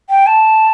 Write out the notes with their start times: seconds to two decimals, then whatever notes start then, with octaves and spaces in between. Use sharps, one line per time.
0.10 G5
0.27 A5